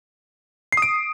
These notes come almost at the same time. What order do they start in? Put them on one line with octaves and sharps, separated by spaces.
C7 D#6 D7